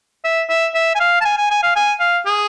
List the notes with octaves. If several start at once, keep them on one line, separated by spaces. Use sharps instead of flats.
E5
E5
E5
G#5
F5
A5
G#5
G#5
G#5
F5
G#5
F5
G#4